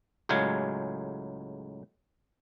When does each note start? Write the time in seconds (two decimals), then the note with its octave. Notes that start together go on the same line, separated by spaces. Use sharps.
0.29 C#2 A2 F#3 G#3 F5 G#5